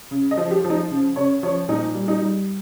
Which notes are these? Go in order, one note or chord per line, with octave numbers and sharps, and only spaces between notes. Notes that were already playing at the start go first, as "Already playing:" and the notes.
C#3
D#5
F3
G4
F3
D#4
C#3
C#3 C#5
F3 C#5
A#2 D#4
G3
D#4
G3